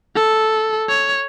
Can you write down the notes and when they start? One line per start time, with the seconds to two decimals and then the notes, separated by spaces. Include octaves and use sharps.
0.16 A4
0.89 C#5